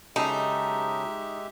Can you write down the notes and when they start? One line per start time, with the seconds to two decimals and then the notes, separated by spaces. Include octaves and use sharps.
0.16 C#3 F#3 G#3 D#4 G4 A4 E5